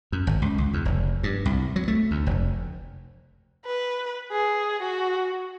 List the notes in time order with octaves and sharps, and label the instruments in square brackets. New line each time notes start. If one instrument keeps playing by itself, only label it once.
[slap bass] F#2
G#1
C#2
C#2
E2
F1
G2
C2
F#3
A3
D2
F1
[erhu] B4
G#4
F#4